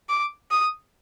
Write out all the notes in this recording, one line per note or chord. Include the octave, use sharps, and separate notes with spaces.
D6
D#6